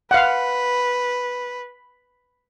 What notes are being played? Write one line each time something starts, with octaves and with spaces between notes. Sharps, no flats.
B4 F5 F#5